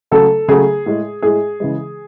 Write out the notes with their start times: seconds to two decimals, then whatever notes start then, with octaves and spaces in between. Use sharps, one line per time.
0.11 C#3 F#3 A3 A4
0.48 C#3 F#3 A3 G#4
0.86 A2 G#3
1.22 A2 G#3 G#4
1.60 C#3 E3 G#3